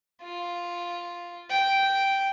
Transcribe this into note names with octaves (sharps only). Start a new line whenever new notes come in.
F4
G5